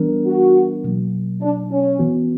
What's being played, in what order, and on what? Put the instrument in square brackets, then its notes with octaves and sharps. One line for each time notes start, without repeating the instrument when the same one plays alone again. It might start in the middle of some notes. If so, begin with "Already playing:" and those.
Already playing: [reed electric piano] E3 G3 B3 D4 A#4
[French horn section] F#4
[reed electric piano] B2 F#3 A#3
[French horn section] D4
C#4
[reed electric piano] E3 B3 F#4